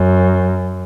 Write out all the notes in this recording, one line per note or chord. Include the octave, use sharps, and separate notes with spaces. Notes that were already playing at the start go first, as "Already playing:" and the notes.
Already playing: F#2